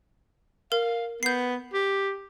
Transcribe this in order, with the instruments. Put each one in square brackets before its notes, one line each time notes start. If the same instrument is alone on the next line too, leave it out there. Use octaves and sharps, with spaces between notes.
[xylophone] A#4 [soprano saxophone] F5
[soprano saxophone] B3 [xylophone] G6 C7
[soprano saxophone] G4